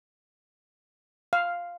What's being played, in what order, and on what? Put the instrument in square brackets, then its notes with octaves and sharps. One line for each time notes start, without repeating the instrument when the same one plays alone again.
[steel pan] F5